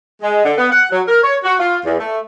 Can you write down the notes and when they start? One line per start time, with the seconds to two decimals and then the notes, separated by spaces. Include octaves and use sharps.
0.22 G#3
0.45 D3
0.58 B3
0.71 F#5
0.91 F#3
1.08 A#4
1.23 C#5
1.44 F#4
1.59 F4
1.85 E2
1.99 A3